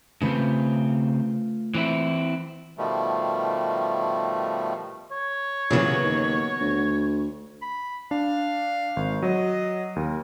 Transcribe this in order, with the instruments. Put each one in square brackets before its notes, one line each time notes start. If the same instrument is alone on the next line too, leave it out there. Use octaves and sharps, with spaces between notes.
[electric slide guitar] C#3 C4 [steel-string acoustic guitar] A3 F4 B4
[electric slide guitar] E3 C4 E4
[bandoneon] B2 D#3 F3 G3 A3
[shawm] C#5
[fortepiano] A#2 C#3 E3 [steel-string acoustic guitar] F#3 B3
[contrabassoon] D#2
D2
[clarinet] B5
[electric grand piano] D4 [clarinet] F5
[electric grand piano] G#1
[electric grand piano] F#3 [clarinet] D#5
[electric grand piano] D#2 [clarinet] A#4